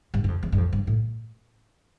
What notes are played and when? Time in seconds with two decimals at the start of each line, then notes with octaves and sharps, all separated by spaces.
0.14 G2
0.24 G2
0.28 F2
0.43 E2
0.52 G2
0.58 F2
0.73 G2
0.87 A2